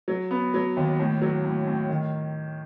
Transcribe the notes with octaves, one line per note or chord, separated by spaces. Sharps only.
F#3
B3
F#3
D#2
A2
F#3
A2
A2
D#3